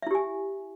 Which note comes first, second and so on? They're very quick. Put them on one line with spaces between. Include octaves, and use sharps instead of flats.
E5 E4 G4 G#5